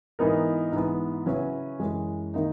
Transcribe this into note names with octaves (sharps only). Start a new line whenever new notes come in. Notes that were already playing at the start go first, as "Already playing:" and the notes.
G#2 E3 B3 D#4 A#4
G#2 E3 B3
C#3 F#3 C#4 E4 B4
F#2 E3 G#3
D#3 A#3 D#4